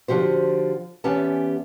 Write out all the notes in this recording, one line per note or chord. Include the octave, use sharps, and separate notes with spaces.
D3 F3 F#4 G4 C5
E2 B3 C#4 G4 A5